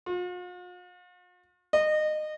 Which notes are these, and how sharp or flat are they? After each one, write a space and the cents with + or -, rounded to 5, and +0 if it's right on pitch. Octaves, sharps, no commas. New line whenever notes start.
F4 +45
D#5 -25